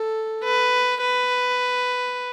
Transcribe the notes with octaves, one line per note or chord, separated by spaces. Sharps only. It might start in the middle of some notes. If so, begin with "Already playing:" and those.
Already playing: A4
B4
B4